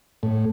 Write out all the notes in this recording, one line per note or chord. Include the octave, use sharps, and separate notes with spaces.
A2